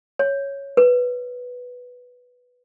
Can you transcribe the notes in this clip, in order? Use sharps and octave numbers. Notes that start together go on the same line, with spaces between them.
C#5
B4